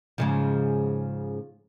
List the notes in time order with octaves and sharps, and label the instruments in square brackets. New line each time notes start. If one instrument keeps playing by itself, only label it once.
[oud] G#2 C#3 F3